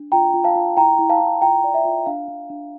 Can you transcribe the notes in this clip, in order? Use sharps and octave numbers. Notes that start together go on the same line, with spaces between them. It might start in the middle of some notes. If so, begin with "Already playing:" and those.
Already playing: D4
F4 G5 A#5
F4
F5 A5
F4
E4 G5 A#5
E4
F5 A5
E4
F4 G5 A#5
D5
E5
F4
D4 F5
D4
D4